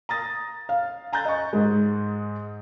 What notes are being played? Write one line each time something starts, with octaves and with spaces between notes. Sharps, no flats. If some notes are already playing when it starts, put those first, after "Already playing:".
A#5 D#6 A6 A#6
F5
G#5 A#5 F#6 G6 A6
D#5 C#6
G#2 G#3